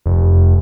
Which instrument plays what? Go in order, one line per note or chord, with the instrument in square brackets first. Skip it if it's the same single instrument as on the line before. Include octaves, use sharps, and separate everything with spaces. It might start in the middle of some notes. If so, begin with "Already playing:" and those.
[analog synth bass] F1